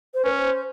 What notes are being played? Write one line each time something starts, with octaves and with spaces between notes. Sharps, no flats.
C5
C#4 B4
C5